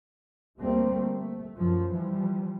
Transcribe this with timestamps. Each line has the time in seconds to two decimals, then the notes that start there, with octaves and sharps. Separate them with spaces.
0.59 D2 G3 A3 A#3 C4
1.11 A3
1.55 F#2 F3
1.91 E3 F3 G3